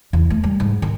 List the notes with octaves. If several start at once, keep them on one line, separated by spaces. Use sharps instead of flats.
E2
A3
G3
G#2
D#3